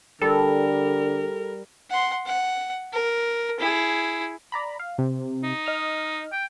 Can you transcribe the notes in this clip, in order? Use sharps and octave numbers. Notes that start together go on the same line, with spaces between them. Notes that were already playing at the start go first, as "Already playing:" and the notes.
D3 G3 A4 A#4
F#5 C6
F#5
A#4
E4 G#4
D5 A#5 B5
F5
C3
D#4
D#5 F6
G5